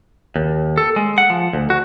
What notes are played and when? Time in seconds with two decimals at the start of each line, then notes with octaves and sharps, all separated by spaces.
0.36 D#2
0.78 A4
0.96 G#3
1.18 F#5
1.30 F3
1.53 D2
1.70 F#4